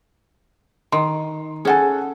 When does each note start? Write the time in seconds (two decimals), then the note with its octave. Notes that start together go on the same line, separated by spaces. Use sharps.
0.92 D#3 C6
1.65 C#4 G#4 A4 F#5 G#5